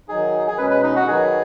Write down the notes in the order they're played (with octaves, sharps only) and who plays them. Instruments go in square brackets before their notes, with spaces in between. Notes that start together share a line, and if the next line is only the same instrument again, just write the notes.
[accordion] D#3 F#3 D#4 [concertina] G#4
[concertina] G#4
[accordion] B2 G#3 C#4 [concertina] B4
[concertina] B4
D#4
F#4
[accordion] D#3 F#3 D#4 B4 [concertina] G#4